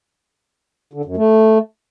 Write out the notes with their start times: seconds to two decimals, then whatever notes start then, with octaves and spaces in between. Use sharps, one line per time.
0.93 D3
1.05 F#2
1.17 A3